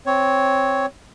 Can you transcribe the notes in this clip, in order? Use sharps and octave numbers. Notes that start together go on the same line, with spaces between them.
C4 C#5